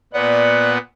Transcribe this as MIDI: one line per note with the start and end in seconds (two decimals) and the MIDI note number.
0.13 0.78 46
0.13 0.78 59
0.13 0.71 74
0.13 0.78 78